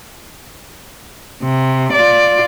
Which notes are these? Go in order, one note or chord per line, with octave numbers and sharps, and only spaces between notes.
C3
F4 D5